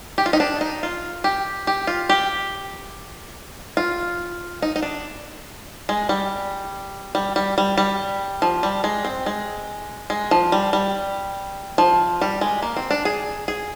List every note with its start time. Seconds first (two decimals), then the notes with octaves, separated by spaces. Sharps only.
0.18 G4
0.26 F4
0.33 D#4
0.40 D4
0.61 D#4
0.83 F4
1.24 G4
1.67 G4
1.87 F4
2.09 G4
3.77 F4
4.62 D#4
4.76 D#4
4.82 D4
5.89 G#3
6.09 G3
7.15 G3
7.36 G3
7.58 G3
7.78 G3
8.42 F3
8.63 G3
8.84 G#3
9.05 C4
9.26 G#3
10.10 G#3
10.31 F3
10.52 G3
10.73 G3
11.78 F3
12.21 G3
12.41 G#3
12.62 A#3
12.77 C4
12.91 D4
13.05 G#4
13.48 G#4